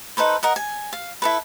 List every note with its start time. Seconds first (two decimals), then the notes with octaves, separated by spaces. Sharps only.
0.17 D#4 A4 B4 C5
0.43 A#4 D#5 F#5
0.56 G#5
0.93 F5
1.22 E4 A4 B4